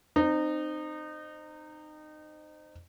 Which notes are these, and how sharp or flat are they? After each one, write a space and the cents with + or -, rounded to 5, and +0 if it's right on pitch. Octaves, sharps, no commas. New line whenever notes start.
C4 +0 D#4 -25